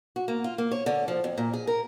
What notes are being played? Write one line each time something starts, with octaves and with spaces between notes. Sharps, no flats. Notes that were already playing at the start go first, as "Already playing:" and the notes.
F#4
A#3
F4
A#3
C#5
D3
F3
F2
A#2
G#4
A#4